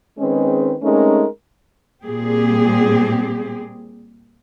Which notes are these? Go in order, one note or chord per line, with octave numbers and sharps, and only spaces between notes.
D#3 G#3 C4 C#4 G#4 B4
G#3 A3 C4 C#4 D#4 A#4
A#2 G3 C4 G4 G#4